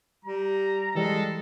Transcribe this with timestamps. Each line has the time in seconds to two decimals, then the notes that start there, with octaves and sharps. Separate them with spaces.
0.25 G3 A#5
0.95 E3 G3 G#3 A4